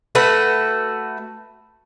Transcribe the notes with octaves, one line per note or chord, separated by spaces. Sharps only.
A3 F#4 B4